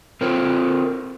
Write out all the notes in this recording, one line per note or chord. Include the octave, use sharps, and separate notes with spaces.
C4 F4 A4 A#4 C5 C#5